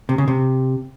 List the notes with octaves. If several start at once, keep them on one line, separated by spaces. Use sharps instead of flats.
C3
C#3
C3